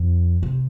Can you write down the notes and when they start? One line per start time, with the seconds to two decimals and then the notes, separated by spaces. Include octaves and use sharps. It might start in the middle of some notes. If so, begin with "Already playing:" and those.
Already playing: F2
0.43 C3